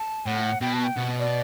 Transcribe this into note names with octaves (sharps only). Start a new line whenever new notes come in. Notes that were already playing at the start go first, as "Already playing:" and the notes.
Already playing: A5
A2 F#5
B2 G5
A5
G5
B2 F#5
D5